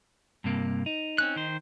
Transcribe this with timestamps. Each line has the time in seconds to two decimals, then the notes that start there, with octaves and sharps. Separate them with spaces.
0.44 G2 C3 A#3
0.86 D#4
1.18 C4 C#4 F#6
1.36 D#3 C5